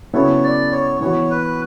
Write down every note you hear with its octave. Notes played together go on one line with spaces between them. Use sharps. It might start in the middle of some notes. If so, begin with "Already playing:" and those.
C#3 F#3 B3 E4 A4 C#5
D5
C#5
E3 B3 F#4 C#5
B4